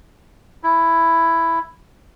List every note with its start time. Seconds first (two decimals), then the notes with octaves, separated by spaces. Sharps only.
0.63 E4